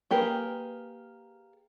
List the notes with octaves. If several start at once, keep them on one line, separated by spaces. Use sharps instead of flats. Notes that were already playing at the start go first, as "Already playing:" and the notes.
A#3 G4 G#4 A#4 B4